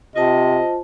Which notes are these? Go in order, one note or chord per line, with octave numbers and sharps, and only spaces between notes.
C3 F4 C5 D#5 A5